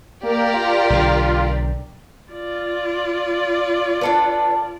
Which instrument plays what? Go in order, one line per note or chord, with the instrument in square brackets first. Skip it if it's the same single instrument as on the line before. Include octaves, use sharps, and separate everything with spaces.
[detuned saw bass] A#3 [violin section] G4 A#4 D5
[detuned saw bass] F4
[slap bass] B1 D3
[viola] F4 D5
[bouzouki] D4 A4 B4